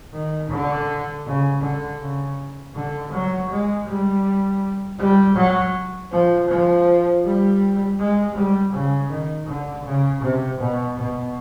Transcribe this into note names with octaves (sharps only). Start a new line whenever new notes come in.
D#3
D3
C#3
D3
C#3
D3
F#3
G#3
G3
G3
F#3
F3
F3
G3
G#3
G3
C#3
D#3
D3
C#3
C3
B2
B2